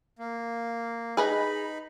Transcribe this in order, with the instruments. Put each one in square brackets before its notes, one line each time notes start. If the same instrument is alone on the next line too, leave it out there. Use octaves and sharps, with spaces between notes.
[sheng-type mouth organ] A#3
[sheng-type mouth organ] D#4 B5 [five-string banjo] G#4 B4 D#5